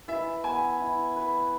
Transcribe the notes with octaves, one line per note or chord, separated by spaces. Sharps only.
E3 E5
B3 G#5
E4
B4